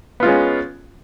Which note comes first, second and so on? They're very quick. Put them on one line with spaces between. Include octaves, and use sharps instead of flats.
B3 F4 G#3 C#4